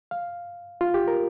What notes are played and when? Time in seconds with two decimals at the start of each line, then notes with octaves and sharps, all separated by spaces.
0.11 F5
0.81 F4
0.94 G4
1.08 A#4